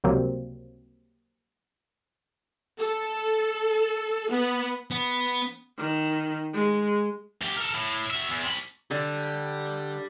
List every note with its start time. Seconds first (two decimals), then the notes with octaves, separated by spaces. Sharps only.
0.04 C#2 C3 F#3 G3 A#3 C4
2.80 A4
4.31 B3
4.91 B3
5.79 D#3
6.54 G#3
7.42 D2 G4
7.57 A4 A#4
7.75 A2
8.10 F#4 E5
8.29 E2
8.44 C3 B5
8.91 D3 G4 D5